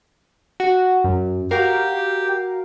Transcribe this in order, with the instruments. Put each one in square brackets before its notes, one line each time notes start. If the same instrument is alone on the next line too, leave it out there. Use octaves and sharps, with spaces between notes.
[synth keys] F#4
F#2
[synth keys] F#4 A#4 F5 [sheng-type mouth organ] G4